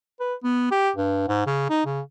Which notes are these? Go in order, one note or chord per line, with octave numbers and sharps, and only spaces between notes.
B4
B3
G4
G2
G#2
C#3
D#4
C#3